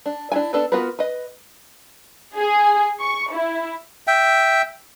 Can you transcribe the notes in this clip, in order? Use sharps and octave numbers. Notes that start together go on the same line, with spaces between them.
D4
D4 E4 G#5
B3 D4 A4 B4
B3 F4 F#4 A#4 B4
B4 D#5
G#4
C#6
E4
E5 G5